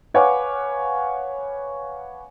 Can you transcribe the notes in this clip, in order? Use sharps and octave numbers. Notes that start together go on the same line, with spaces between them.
B4 C#5 F5 F#5 G#5 D6